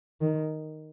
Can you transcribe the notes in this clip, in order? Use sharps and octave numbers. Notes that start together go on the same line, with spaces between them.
D#3